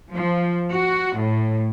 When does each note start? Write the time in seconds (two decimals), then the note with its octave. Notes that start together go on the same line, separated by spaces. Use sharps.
0.12 F3
0.76 F#4
1.21 A2